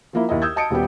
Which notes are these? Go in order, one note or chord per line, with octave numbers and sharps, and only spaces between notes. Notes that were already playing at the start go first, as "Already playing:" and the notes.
F3 A#3 E4
D#2 E4 D#5
D#6 E6 G6 G#6
D#5 A5 D#6 C#7 D7
D#1 G3 B3 G4